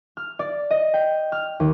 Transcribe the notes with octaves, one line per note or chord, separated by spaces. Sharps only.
F6
D5
D#5
G5
F6
D#2